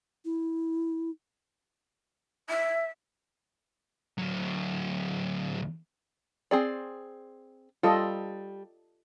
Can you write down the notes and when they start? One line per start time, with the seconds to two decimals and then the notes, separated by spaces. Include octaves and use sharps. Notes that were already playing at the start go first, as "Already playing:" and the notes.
0.25 E4
2.49 E5
4.18 D2 F#3
6.51 C4 G#4 D5
7.83 G3 F4 A4 D#5